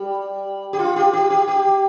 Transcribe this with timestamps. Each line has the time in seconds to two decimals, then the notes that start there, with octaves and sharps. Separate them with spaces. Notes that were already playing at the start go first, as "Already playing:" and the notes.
Already playing: G3
0.73 G4
0.79 F4
0.96 G4
1.13 G4
1.30 G4
1.48 G4